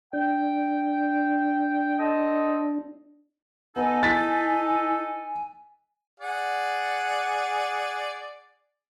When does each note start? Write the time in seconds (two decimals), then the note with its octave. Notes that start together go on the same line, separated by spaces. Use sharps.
0.13 D4 G5
1.99 C4 A4 D#5
3.76 B3 D#4 A4 F#5 G#5
4.03 E4 A6 B6
6.20 G#4 D5 F#5